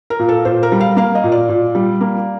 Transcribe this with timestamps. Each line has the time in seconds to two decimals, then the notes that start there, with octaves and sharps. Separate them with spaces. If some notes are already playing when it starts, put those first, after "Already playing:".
0.10 A#4
0.19 A#2
0.29 A4
0.45 A#2 C5
0.63 A#4
0.72 G3
0.81 F5
0.97 A#3 F5
1.15 D#5
1.24 A#2
1.32 D5
1.49 A#2
1.75 G3
2.01 A#3